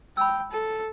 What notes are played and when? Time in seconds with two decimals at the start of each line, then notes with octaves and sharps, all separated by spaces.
0.17 G5 B5 E6
0.51 A4